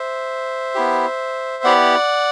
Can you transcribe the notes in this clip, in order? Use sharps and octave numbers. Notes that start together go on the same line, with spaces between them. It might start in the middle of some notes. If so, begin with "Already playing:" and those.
Already playing: C5 E5
B3 E4 G4
B3 E4 G4 D5 F#5